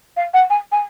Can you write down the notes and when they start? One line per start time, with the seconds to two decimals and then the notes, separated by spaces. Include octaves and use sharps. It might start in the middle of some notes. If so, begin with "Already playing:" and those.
0.17 F5
0.34 F#5
0.50 G#5
0.72 G#5